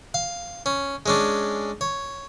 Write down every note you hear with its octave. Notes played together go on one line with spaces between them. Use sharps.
F5
C#4
G#3 C#4 D4
C#5